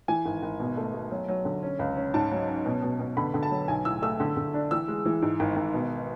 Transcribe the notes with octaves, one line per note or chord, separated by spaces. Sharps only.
E3 G#5
G#1
G#1
B2
A3
A3
F#3
F#3
D3
C#4
C#2
C#4
G#2 A5
F#3
C#4
B2
B2
B2
D3 B5
D3
A5
F#3
B1 G#5
A2 E6
A3 E6
D3
D3
D4
E3 E6
G#3
E3
G#2
G#1
G#1
B2